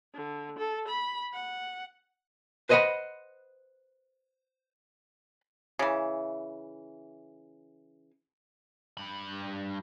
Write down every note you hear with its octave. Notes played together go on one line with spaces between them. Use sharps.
D3
A4
B5
F#5
B4 C5 D#5 E5 F#5 B5
C#3 E3
G2 B5